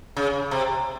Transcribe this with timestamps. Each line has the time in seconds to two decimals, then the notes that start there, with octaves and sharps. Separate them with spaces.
0.17 C#3
0.51 C3